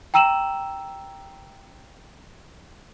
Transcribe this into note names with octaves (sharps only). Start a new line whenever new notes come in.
G5 A#5 E6 D#7 E7 F#7